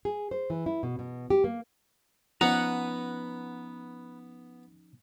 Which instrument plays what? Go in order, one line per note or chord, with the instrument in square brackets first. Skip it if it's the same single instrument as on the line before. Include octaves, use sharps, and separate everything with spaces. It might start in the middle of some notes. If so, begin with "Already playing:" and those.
[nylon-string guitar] G#4
C5
E3
E4
B2
B2
G4
A#3
[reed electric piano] F3 C#4 D#4 [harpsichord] B3 [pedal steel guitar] B4 A#5 [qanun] F#5